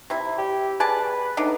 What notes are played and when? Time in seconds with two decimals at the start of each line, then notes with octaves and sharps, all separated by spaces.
0.10 C3 E4
0.38 G4
0.80 G#4 B4 D5 A5
1.37 A2 B3 D4 D#4